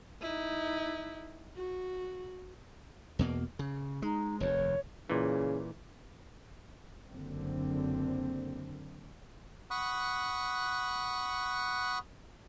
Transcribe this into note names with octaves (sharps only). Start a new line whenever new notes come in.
D#4 E4
F#4
E2 B2 A#3
C#3
G#3 D#4
F1 D#2 C#5
A#2 C#3 E3
F#1 D3 C4
F#5 B5 C#6 D#6 F#6